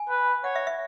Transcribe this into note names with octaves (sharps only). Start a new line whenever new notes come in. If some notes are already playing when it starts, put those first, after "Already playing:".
Already playing: G#5
B4
C#5 F#5
E5
E5